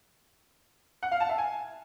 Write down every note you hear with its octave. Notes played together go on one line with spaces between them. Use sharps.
F#5
F5
A5
E5
G#5